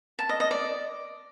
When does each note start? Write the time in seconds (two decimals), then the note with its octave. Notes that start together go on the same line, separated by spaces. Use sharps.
0.19 A5
0.29 D#5
0.40 D#5
0.51 D5